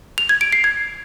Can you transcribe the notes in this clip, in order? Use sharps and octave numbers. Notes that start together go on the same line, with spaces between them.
F7
G#6
D7
C7
G#6